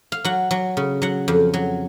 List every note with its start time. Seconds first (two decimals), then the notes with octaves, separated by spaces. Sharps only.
0.12 F5
0.24 F#3 F#5
0.51 F#3
0.77 C#3
1.02 F#3 F#5
1.28 F2
1.54 F#3